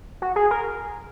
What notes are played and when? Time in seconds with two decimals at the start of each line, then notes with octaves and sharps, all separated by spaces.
0.22 F#4
0.36 G#4
0.51 A#4